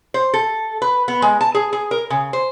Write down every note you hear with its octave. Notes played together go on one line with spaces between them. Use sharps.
C5
A4
B4
B3
G#3
A5
G#4
G#4
A#4
C#3
C5